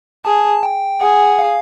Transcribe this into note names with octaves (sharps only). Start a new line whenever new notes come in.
G#4 A5
G5
G#4 F#5
F5